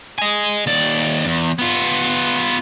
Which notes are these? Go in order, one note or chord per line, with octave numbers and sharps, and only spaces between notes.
D#5 G#5
D#2 D5
E2
B3 F4